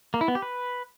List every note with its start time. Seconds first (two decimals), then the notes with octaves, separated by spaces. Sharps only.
0.14 A#3
0.21 E4
0.28 B3
0.35 G4
0.42 B4